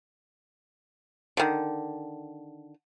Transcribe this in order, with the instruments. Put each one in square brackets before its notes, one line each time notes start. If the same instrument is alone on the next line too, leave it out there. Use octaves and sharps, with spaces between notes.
[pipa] D3 D#3